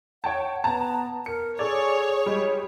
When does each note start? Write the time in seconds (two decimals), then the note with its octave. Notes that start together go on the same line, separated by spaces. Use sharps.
0.24 C#5 F#5 G5 A5
0.64 B3 A5 A#5
1.26 A#4 C#7
1.59 G#4 A4 C#5 D5
2.26 G3 G#3